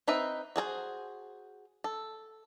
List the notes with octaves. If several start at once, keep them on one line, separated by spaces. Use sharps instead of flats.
C4 D#4 B4 E5
F#4 G#4 A4 C5
A4